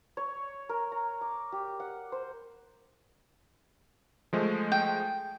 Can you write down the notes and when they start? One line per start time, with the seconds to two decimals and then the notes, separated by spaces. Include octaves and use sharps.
0.17 C#5
0.69 A#4
0.92 A#5
1.21 D6
1.52 G4
1.80 F#5
2.12 C5
4.33 F3 G#3 A3
4.72 G5